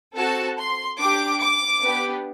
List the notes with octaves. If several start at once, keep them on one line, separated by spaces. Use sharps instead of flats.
C4 F#4 A4 A5
C6
D4 G4 D6
D6
B3 D4 G4